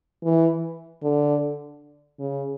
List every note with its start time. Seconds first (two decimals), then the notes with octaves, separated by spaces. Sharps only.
0.24 E3
1.03 D3
2.19 C#3